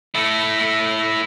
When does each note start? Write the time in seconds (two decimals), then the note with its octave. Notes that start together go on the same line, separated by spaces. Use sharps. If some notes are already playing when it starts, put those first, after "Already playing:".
0.15 A3 E4